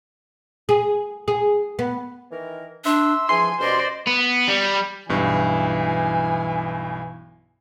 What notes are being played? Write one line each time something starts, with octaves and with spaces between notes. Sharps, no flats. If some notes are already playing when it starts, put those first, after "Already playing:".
G#4
G#4
B3
D#3 E3 A#4
D4 E5 C6 E6
E3 F3 G#4 G#5 C6
D#2 B2 C#4 C5 D5 D#5
B3
G3
B1 G2 E3 G#5